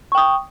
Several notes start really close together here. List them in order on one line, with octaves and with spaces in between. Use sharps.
C#6 G5 D#6